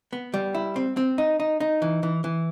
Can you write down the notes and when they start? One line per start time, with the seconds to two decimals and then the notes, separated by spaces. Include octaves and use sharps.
0.13 B3
0.34 G3
0.55 E4
0.76 C4
0.97 C4
1.18 D#4
1.40 D#4
1.60 D#4
1.82 E3
2.03 E3
2.24 E3